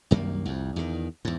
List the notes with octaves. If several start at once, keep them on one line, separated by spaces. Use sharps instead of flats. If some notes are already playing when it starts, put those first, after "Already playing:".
C2 F#2 D#3 A#3
C2 F2
E2 D#3
E2 G#2